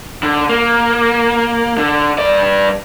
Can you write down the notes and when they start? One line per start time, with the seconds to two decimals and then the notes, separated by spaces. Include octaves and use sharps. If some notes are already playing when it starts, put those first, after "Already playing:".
0.23 D3
0.49 A#3
1.78 D3
2.18 G2 D5